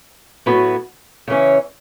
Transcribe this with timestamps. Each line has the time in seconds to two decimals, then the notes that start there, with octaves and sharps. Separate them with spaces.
0.46 A2 F#3 B3 F#4 B4
1.28 C#3 E3 C#4